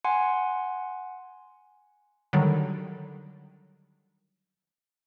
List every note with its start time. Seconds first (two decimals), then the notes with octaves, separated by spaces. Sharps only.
0.04 F#5 G#5 C6
2.33 D3 D#3 F#3 G3